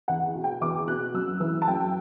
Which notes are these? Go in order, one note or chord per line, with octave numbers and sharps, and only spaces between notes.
E2 F#5
B2
G5
E2 D6
B2 F#6
F#2 E6
E3 E6
A5
F#2 G5